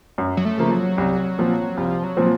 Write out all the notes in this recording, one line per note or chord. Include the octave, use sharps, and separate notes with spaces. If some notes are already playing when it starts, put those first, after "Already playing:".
F#2
F#3
A3
C#3 F3 A#3
F#3
C2
A#2 F3 C4
C2 F3
F#3
A#2 F3 C4